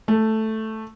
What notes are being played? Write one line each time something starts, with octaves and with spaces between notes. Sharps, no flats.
A3